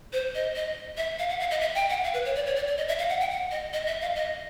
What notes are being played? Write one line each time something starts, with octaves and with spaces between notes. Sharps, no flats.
C5
D#5
D#5
E5
F5
F#5
F5
D#5
E5
G5
F#5
F5
B4
C#5
D5
C#5
D5
D5
D#5
E5
F5
F#5
G5
F#5
D#5
D#5
E5
F5
D#5